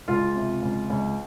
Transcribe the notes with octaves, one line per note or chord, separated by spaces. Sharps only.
C#2 F4
C3
C#2
C#2